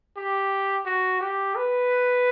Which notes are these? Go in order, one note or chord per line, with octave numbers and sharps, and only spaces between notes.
G4
F#4
G4
B4